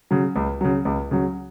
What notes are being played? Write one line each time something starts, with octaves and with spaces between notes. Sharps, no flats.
C#3 F#3
C#2
C#3 F#3
C#2
C#3 F#3